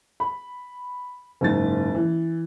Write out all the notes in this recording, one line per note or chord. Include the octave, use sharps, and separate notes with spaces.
B5
F#1 G#2 A6
E3